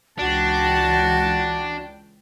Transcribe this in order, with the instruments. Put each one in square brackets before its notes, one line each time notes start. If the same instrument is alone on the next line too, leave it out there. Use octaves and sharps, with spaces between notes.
[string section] C#2 E3 G5 [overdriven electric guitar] D4 [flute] F#4 [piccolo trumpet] A5